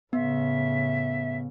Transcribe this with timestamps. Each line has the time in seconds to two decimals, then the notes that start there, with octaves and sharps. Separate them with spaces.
0.13 A2 C#3 B3 E5